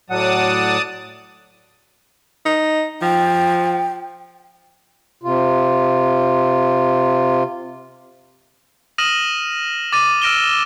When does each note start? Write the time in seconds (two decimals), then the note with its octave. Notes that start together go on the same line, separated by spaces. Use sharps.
0.10 A2 F#3 D5 F#5 A5 D#6
2.46 D#4
3.02 F3 G5
5.23 C3 F4
8.98 D#6 F6 A#6 D#7 E7 F#7
9.92 D6 A6 D#7
10.22 E6 F6 A#6 D7 E7 G7
10.42 E7